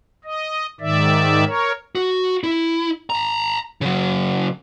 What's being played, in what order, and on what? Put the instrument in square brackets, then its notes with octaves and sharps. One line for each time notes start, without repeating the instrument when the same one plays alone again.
[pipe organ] D#5
G#2 D#3 D5 E5
A#4 C#5
[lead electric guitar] F#4
E4
A5 A#5
C#3 F#3